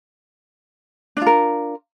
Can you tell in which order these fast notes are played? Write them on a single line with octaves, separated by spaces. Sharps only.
D4 F4 A#4